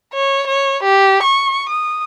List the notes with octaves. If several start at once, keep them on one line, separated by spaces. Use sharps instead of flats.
C#5
C#5
G4
C#6
D#6